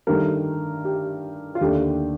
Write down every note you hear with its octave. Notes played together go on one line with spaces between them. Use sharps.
G2 D#3 A3 G4 A#4
G4
F4
D#2 D3 A3 G4